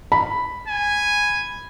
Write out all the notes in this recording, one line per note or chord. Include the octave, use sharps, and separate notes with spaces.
B5
G#5